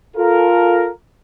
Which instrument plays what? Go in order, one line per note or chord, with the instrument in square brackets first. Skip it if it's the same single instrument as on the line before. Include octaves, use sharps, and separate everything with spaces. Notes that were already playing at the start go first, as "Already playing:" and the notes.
[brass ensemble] F4 A4 A#4